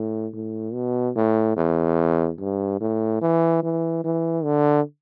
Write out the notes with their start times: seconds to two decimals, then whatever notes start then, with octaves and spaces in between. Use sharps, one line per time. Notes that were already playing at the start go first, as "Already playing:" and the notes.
Already playing: A2
0.33 A2
0.74 B2
1.16 A2
1.56 E2
2.39 G2
2.81 A2
3.21 E3
3.63 E3
4.04 E3
4.44 D3